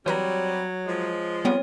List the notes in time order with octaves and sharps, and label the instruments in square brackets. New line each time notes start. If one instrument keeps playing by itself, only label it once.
[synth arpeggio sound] E3 B4 A#5 [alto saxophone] F#3 [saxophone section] G3 C4 [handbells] C#5
[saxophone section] F3 G#3
[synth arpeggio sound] G3 B3 [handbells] C4 C#5